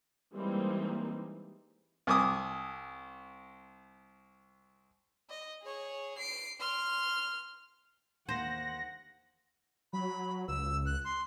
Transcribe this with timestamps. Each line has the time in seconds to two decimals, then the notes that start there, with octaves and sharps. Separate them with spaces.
0.35 E3 G3 G#3 A#3 C4 D#4
2.07 C2 G#5 D6 D#6
5.30 D#5
5.63 G#4 C#5
6.18 C7 D7
6.60 C6 F6
8.29 D#2 A#3 C5 F#5 A#6
9.93 F#3 B5
10.48 C#2 E6
10.86 F#6
11.05 C6